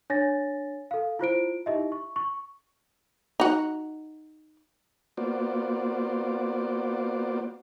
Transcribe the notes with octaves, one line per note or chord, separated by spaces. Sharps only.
D4 C#5 G#5 A6 A#6
A4 F5
E4 F4 C5 D7
D#4 E4 G4 D#5 E5
C#6
C#6
D#4 F#4
A#3 B3 F4 F#4 C5 D5